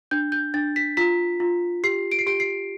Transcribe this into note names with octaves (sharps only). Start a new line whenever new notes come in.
D4 G6
G6
D4 A6
B6
F4 B6
F4
G4 C7
D7
C7
G4 D7
C7